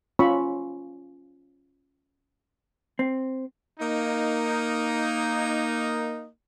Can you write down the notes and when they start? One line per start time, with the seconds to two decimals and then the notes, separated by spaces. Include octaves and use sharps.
0.19 C#4 F4 C#5 B5 C#6 E6
2.99 C4
3.80 A#3 D#4